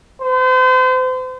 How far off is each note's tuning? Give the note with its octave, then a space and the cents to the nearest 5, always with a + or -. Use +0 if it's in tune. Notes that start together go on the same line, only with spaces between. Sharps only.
C5 -40